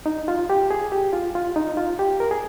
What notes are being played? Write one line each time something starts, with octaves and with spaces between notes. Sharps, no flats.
D#4
F4
G4
G#4
G4
F4
F4
D#4
F4
G4
A#4
G#4